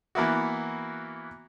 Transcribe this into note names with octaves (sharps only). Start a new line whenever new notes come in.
E3 A#3 B3 E4 F#4